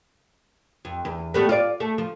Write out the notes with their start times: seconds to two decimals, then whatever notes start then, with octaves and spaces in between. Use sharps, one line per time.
0.85 F2
1.05 E2
1.34 G3 A3 B3
1.49 F4 D5
1.80 A3
1.98 F3